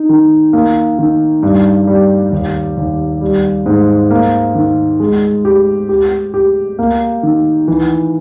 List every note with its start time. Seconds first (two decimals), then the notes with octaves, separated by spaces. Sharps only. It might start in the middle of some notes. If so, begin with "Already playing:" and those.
Already playing: D#4
0.09 D#3
0.53 A#3
0.99 D#3
1.43 G2
1.87 G3
2.32 D#2
2.77 D#2
3.21 G3
3.66 G#2
4.11 A#3
4.55 D#3
5.00 G#3
5.45 G4
5.89 G4
6.34 G4
6.79 A#3
7.23 D#3
7.68 E3